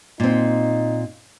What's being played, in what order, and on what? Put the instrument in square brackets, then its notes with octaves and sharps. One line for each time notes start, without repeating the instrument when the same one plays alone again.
[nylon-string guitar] A#2 C4 [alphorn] D#4